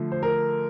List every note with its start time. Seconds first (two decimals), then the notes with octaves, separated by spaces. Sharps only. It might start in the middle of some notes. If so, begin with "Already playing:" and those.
Already playing: D3 F3 A3
0.12 C5
0.23 A#4